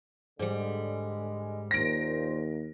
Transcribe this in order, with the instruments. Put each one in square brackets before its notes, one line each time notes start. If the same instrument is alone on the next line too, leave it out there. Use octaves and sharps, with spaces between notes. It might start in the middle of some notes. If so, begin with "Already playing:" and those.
[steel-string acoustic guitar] G#2 G3 [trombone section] D3 G#3
[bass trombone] D#2 [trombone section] A#2 C5 [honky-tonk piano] A#6 D7